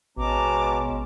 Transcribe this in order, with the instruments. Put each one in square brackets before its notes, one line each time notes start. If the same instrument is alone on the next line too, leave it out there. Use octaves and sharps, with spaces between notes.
[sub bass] A1 [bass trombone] B2 [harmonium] G#3 C#4 [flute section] A5 A#5 D6